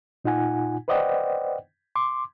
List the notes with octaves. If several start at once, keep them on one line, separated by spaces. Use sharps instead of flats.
A#2 D#4 F4 F#5 G#5
B4 C5 D5 D#5 F#5 G5
C6 D6